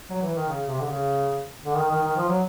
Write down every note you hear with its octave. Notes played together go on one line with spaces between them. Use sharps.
F#3
E3
D#3
C#3
C3
D3
C#3
D3
D#3
D#3
D#3
F3
F#3